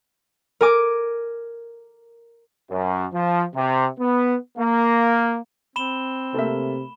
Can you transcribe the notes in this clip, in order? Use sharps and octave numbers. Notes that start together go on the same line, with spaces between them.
A#4 G#5 D6
F#2
F3
C3
B3
A#3
C4 B5 E7 G7
C3 A3 A#3 E5